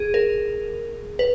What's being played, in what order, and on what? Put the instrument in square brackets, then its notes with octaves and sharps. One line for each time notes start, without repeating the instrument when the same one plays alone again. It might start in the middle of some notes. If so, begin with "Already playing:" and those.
Already playing: [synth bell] G#4
A#4
B4